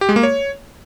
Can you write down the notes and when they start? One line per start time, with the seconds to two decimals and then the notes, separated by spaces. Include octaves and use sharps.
0.01 G4
0.09 G#3
0.16 A#3
0.23 C#5